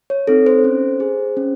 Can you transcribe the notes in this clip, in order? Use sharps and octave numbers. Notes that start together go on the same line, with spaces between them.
C#5
C4 D#4 A4
C5
C#4
G#4
C#4